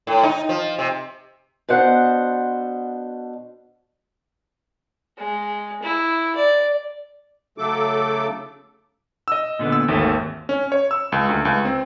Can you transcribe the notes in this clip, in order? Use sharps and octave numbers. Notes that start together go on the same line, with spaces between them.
A2
D#4
F3
C3
B2 D4 C5 F#5
G#3
E4
D5
C#3 F#3 A3 A4 D6
D#5 E6
A#2 D3 B3
E6
G#1 D#2 A3
C#4
C#5
E6
C#2
D2
C#2
C4